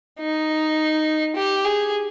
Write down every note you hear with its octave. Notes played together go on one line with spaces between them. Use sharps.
D#4
G4
G#4